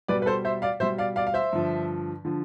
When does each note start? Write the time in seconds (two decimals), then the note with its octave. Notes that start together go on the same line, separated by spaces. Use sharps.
0.08 B2 G3 B4 D5
0.22 B4
0.26 A4 C5
0.45 C5 E5
0.62 D5 F5
0.80 B2 G3 C5 E5
0.98 D5 F5
1.16 D5 F5
1.27 F5
1.34 C5 E5
1.53 G2 D3 F3
2.25 D3 F3